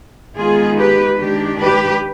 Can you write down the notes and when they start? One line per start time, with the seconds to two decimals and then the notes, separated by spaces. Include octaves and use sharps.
0.36 D#3 G#3 B3 D#4 F4 G#4
0.78 G4 B4
1.19 D#3 G#3 D4 G4
1.61 G4 B4